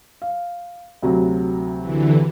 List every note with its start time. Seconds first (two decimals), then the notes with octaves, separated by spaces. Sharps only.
0.22 F5
1.02 D2 C3 F#3
1.80 D3 E3